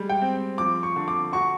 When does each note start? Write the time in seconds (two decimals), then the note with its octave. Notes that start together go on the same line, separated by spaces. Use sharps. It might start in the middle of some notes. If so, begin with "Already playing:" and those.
Already playing: G3 G#3
0.10 G5
0.21 C4
0.58 F3 D6
0.83 C#6
0.96 D3
1.08 D6
1.32 F#4 C#6